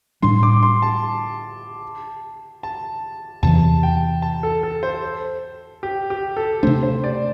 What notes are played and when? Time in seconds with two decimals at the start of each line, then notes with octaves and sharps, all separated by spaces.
0.22 A2 G3 D4 C6
0.43 D6
0.63 C6
0.82 A5
2.63 A5
3.43 E2 C3 E3 A5
3.83 G5
4.22 A5
4.43 A4
4.63 A4
4.83 C5
5.83 G4
6.10 G4
6.37 A4
6.63 C3 A3 D4 C5
6.83 C5
7.04 D5